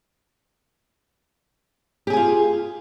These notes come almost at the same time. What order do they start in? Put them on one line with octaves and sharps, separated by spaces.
G4 G#4 G#5 F4